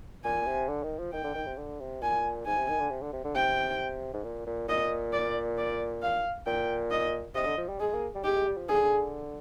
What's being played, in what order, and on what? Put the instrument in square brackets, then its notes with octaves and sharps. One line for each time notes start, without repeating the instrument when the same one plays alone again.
[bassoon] A#2 [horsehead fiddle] G#5
[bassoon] C3
D3
D#3
F3
[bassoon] D#3 [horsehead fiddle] G5
[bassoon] D3
D#3
C3
D3
C3
[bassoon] A#2 [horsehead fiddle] G#5
[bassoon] G#2 [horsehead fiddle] G#5
[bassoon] C3
D#3
D3
C3
D3
C3
D3
[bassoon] C3 [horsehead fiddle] G5
[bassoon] G#2
A#2
A#2
[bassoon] A#2 [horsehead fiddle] D#5
[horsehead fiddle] D5
D5
F5
[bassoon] A#2 [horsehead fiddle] G5
[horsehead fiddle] D#5
[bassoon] C3 [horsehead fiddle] D#5
[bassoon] D3
F3
G3
[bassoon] G#3 [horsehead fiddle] G#4
[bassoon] A#3
G3
[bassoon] G#3 [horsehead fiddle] G4
[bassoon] G#3
G3
F3
[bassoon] D3 [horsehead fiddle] G#4